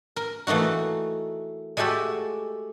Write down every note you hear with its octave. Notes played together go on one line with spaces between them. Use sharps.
A#4
E3 A3 A#3 D#4 F#4
G#3 A3 F#4 G4 A4